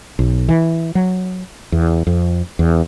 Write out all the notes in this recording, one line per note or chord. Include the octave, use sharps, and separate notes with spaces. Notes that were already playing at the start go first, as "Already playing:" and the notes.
B1
E3
F#3
E2
F2
E2